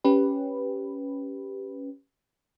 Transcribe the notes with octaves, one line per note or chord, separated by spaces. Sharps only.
C#4 G4 B4